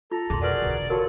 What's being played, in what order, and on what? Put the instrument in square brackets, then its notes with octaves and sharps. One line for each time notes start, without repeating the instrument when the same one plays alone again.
[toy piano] F4 [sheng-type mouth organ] A4 A#5
[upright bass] F2 B2 [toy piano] G#4 C6
[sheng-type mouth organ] F#4 G#4 A#4 [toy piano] B4 F#5 A5 [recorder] D5
[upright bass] E1 D3
[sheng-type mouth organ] F4 A4 C#5 [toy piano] F#4 A#4